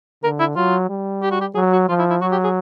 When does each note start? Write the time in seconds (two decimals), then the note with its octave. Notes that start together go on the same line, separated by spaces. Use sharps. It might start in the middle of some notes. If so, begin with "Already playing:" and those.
0.24 D3 A#4
0.40 E4
0.56 F#3 F4
0.89 G3
1.23 G4
1.31 F#4
1.41 G4
1.55 F#3 G#4
1.73 F#4
1.89 F3 F4
1.99 E4
2.10 E4
2.21 F#3 F#4
2.32 G4
2.44 G#4